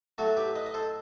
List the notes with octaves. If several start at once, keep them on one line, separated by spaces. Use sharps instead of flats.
A2 F#3 A3 F#4 A4
G4 B4
B4 D#5
D#5
A4 C5